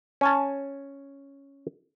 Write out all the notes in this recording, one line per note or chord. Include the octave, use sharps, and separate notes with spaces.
C#4 G#5 A5